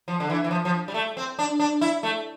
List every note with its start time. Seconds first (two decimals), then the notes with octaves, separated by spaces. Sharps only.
0.08 F3
0.20 D3
0.30 E3
0.44 E3
0.51 F3
0.65 F3
0.88 G3
0.94 A3
1.17 C4
1.39 D4
1.59 D4
1.81 E4
2.03 A3